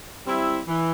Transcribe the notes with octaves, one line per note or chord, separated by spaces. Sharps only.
G3 C4 E4
E3